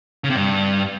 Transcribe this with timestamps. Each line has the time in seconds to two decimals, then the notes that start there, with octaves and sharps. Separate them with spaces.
0.24 C#3
0.30 C3
0.36 G2